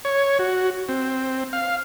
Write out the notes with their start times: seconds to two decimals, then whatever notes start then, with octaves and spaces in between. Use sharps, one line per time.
0.05 C#5
0.39 F#4
0.89 C4
1.53 F5